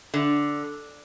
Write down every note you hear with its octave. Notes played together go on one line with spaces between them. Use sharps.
D3